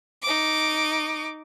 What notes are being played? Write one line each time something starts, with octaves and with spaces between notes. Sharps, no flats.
D#4 D6